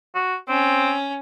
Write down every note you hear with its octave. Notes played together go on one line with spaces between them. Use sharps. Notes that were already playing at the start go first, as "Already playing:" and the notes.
F#4
C4 C#4